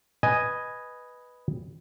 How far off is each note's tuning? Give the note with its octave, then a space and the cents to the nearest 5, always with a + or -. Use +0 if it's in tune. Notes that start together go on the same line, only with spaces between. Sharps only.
B4 +0 D#5 +0 G#5 +0